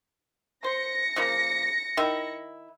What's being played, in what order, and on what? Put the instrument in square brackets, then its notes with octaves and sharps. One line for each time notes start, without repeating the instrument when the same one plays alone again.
[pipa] C5 [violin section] A#6 C#7
[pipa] C#3 F3 A#3
D#3 E4